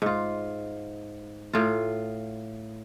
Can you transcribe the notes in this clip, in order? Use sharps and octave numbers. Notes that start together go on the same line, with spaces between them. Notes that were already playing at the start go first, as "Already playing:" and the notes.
G#2 F4
A2 F4